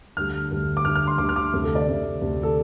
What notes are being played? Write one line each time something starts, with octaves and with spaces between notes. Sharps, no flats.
D2 D3 G3 F6
D2 D3 G3
D6
D2 D3 G3 F6
F6
C6
D2 D3 G3 D6
F6
D6
D2 C3 A3
A4
D5
D2 C3 A3
D2 C3 A3
A4